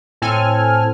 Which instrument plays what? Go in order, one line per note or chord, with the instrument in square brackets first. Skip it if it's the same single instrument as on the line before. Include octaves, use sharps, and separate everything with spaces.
[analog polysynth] A2 C4 A4 G#5 F6